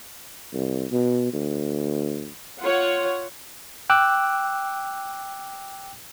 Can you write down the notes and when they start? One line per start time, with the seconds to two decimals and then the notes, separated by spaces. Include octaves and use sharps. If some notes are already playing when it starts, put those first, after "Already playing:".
0.53 C2
0.92 B2
1.33 D2
2.61 F4 C#5 F#5
3.90 G5 D6 E6 F#6